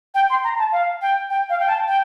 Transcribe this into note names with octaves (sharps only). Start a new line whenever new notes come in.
G5
C6
A#5
A5
F5
G5
G5
F5
G5
A5
G5